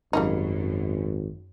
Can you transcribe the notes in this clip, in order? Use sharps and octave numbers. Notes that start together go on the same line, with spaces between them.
G#1 F#2 G3 A#3 D#4